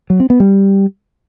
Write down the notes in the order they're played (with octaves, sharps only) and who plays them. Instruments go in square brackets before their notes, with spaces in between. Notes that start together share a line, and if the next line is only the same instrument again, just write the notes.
[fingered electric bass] F#3
C4
B3
G3